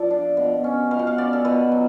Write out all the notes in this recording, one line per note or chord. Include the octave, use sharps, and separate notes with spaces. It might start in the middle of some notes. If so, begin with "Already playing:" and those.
Already playing: F3 A4 D5
D4
B2
C#4
B2 F5
F#5
F5
C#4 D5
A4
B2 B4
F#3